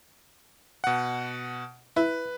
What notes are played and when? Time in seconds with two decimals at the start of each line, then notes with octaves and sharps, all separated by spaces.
0.84 B2 F#5
1.97 E4 B4